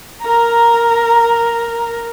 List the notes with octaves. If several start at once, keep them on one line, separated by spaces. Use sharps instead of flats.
A#4 A#5